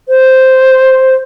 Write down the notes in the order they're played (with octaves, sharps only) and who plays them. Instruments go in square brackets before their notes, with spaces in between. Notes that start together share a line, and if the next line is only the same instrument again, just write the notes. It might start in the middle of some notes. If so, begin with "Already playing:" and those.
[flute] C5